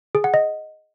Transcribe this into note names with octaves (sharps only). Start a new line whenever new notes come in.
G#4
F#5
D#5